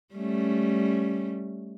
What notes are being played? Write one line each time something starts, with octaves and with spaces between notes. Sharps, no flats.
G3 A3 C#4